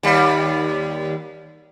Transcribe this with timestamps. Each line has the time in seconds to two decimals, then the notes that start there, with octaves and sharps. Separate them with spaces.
0.03 D#2 G3